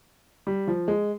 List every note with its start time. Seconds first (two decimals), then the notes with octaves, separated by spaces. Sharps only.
0.47 G3
0.67 F3
0.88 G#3